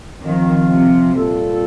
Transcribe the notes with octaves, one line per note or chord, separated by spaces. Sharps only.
D#3 F3 C4 F4
C3
A#2 G3 C4 F4 A4